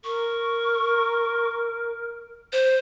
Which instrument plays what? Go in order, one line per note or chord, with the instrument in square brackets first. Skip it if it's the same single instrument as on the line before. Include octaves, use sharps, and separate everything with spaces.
[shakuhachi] A#4 [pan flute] C#6
[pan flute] C5